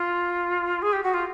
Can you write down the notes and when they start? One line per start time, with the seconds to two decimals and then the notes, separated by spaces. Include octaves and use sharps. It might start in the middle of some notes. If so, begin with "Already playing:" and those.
Already playing: F4
0.82 G#4
0.92 G4
1.03 F#4
1.13 F4